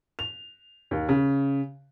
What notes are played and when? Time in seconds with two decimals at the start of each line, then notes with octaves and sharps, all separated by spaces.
0.19 F7
0.91 D#2
1.09 C#3